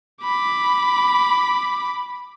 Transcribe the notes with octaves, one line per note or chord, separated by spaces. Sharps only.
B5 D6